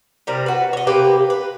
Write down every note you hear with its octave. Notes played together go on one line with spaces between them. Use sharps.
C3 G3 A#4
F#4 B4
C#5 D#5
C3 A#3 G4 B4
B4